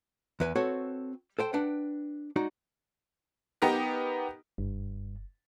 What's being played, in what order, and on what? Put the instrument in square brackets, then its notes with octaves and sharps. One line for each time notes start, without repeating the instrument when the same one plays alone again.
[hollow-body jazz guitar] E2 B4 G#5
C4 F#4 A4 B4 C#5
A4 C5 G5
D4 B4 F#5 G5
G#3 D#4 F#4 D5
[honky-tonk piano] B3 D#4 G4 A#4
[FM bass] F#1 [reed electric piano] G2